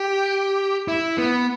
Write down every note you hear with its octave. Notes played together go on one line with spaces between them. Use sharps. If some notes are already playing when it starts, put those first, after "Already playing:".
Already playing: G4
E4
B3